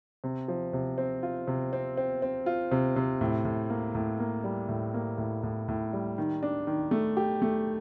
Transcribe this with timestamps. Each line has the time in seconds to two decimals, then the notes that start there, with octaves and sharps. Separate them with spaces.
0.24 C3
0.48 F3
0.73 C3
0.98 C4
1.23 F4
1.47 C3
1.73 C4
1.97 C4
2.22 C4
2.46 F4
2.71 C3
2.96 C3
3.21 A2
3.45 A2
3.70 A#3
3.95 A2
4.19 A#3
4.44 G3
4.69 A2
4.94 A#3
5.18 A2
5.43 A2
5.68 A2
5.93 G3
6.18 D#3
6.43 D4
6.67 D#3
6.91 A3
7.17 G4
7.42 A3